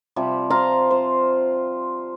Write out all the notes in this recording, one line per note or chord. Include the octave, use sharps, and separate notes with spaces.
C3 F3 G3
F4 F5 A#5 C6
C5